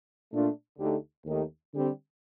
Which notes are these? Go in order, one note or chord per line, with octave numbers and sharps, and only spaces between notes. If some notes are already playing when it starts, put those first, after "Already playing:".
A#2 A3 D4 F4
D2 D3 A3 D#4 G4
D#2 D#3 A3 D#4 G4
D3 G3 C4 G4